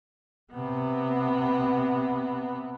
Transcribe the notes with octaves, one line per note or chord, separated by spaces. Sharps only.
C3 B3